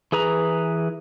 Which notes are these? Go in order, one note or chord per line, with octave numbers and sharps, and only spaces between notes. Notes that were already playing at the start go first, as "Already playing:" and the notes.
E3 G#4 B4 A#5